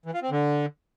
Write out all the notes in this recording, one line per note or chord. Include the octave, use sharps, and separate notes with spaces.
E3
F4
C4
D3